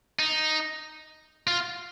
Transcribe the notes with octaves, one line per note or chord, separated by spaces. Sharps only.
D#4
F4